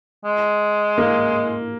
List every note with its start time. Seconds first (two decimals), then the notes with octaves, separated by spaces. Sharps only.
0.25 G#3
0.98 A#3